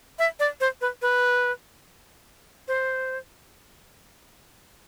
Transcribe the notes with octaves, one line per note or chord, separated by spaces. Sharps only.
E5
D5
C5
B4
B4
C5